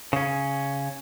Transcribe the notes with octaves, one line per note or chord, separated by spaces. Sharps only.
C#3 C#4